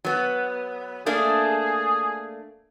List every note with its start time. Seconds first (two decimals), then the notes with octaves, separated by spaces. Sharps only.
0.05 F#3 B3
1.06 A3 A#3 D4 G#4